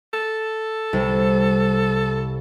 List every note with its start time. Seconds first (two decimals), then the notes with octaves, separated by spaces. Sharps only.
0.13 A4
0.93 C2